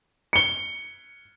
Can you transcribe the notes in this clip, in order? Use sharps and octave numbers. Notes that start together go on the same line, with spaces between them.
C#7 G7